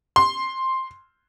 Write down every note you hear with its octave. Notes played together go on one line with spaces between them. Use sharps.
C6